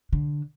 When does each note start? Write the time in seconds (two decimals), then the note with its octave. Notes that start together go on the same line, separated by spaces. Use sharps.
0.12 D3